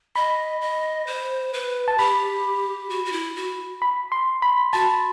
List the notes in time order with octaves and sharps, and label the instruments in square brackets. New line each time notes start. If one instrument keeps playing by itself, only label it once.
[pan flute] D#5 [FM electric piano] B5
[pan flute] D#5
C5
B4
[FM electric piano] A5
[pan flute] G4 [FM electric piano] B5
[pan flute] F#4
F#4
E4
F#4
[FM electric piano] B5
C6
B5
[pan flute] F#4 [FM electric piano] A5